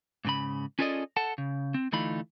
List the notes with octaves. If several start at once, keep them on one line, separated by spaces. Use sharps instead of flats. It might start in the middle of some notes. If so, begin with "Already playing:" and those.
G#2 C#3 B5
C#4 F4 G#4 A4 D5 D#5
A4 F#5 A5
C#3
C4
D2 E3 A3 D#4 F4 B5